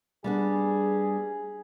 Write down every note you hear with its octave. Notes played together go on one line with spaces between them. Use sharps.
G3 B3 D4 G#4